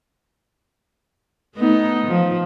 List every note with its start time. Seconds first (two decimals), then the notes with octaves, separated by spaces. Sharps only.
1.56 A3 B3 D#4
2.07 F3